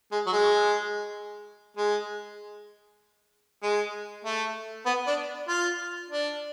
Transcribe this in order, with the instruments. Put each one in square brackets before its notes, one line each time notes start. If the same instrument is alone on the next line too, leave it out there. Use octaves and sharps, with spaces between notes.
[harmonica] G#3
F#3
G#3
G#3
G#3
A3
B3
D4
F4
D4